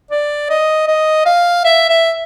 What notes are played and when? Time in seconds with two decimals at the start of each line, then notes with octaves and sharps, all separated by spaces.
0.11 D5
0.50 D#5
0.88 D#5
1.26 F5
1.65 E5
1.90 E5